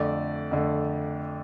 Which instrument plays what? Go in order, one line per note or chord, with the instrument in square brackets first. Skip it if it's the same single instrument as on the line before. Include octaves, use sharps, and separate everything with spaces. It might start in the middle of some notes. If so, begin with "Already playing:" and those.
Already playing: [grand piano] F2 D3 A3 D5
F2 D3 A3